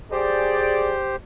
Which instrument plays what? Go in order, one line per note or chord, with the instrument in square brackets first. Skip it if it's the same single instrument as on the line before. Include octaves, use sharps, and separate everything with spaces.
[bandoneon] G4 C5 [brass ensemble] G#4 D5